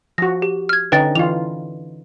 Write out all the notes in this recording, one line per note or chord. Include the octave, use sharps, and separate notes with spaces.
F3 F#4 A#6
G4
F6 G#6
D3 C#4 D#4 B4 G5 A6
E3 F4 F7